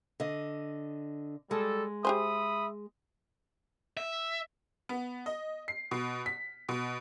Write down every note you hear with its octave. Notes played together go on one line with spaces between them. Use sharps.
D3 D#5
G3 G#3 A4
G4 G#4 C5 E5 B5 D#6
E5
B3
D#5
C7
B2
B6
B2